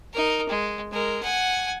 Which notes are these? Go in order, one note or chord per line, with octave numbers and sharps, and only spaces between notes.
D#4 A#4
G#3
G#3 A#4
F#5 G#5